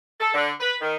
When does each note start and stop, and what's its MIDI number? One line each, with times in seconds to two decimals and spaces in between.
0.20 0.33 69
0.34 0.50 50
0.60 0.75 71
0.81 0.96 51